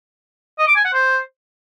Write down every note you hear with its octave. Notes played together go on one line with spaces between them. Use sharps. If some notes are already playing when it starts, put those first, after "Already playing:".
D#5
D6
G#5
F#5
C5